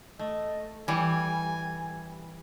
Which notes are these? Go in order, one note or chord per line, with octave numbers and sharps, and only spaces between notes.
A3 D#5
E3 G3 G#5